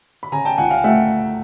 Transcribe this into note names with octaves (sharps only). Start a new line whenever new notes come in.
B5
C#3 G#5 A#5
G5 A5
C#2 F#5 G#5
F5 G5
A3 E5 F#5